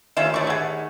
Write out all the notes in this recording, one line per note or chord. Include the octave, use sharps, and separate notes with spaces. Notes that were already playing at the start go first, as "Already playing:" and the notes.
D#2 A3 C#4 F4 E5
D2 A2 D5 C#6
G#4 D5 E5 F#5